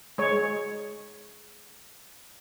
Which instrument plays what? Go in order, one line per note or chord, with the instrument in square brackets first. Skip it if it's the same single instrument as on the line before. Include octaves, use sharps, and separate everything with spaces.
[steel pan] G#3 C#5